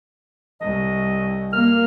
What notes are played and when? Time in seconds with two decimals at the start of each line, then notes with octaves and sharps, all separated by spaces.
0.61 C2 D#5
1.53 A#3 F6